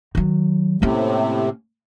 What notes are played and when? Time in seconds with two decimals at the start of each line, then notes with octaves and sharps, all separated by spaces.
0.15 D#3 F#3
0.82 A2 C3 A#3 C#4